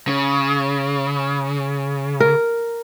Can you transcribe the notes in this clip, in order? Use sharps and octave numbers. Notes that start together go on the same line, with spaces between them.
C#3
A#4